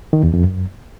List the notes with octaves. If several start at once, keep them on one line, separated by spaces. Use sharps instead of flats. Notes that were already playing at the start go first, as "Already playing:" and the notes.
D#3
E2
F2
F#2